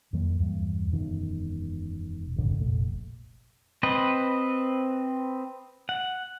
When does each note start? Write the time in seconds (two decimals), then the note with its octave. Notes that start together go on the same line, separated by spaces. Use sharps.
0.13 F2 D#3 F#3 A#3
0.40 E2 G2
0.92 E1 F#2 B2 D#3
2.36 D#1 G#1 F2 D3
2.57 F1 A#1 A3
3.83 C4 B4 C5 D#5
5.89 F#5